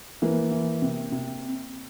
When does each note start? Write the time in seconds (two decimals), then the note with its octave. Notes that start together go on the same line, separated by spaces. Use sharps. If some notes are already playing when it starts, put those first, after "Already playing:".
0.22 E3 A#3
0.51 E3
0.82 C3
1.12 C3